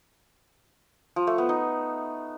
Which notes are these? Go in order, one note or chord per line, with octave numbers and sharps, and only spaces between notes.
F3
A3
B3
D#4